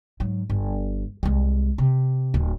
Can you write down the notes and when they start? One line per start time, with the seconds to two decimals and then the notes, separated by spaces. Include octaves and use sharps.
0.20 G#2 F#3
0.50 G1
1.23 C2 G#3
1.78 C3
2.34 D1